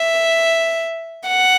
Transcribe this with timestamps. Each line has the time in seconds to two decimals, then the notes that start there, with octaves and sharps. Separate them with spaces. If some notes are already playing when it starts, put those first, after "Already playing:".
Already playing: E5
1.28 F#5